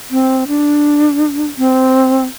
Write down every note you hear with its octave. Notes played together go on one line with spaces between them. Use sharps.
C4
D4
C4